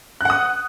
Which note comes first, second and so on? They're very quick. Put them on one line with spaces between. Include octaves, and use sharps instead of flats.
F#6 F#5 D#6